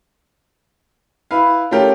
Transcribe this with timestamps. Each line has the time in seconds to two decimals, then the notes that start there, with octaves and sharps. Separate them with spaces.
1.31 E4 B4 F5
1.71 A3 C#4 F4 G4 A#4